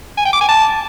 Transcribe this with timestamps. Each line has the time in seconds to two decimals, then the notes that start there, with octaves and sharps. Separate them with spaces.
0.17 G#5
0.25 G5
0.33 D6
0.41 G#5
0.49 A5